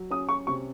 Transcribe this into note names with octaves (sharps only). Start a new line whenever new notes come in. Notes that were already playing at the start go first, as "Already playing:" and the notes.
Already playing: F#3
C#4 D#6
C#6
C3 C#6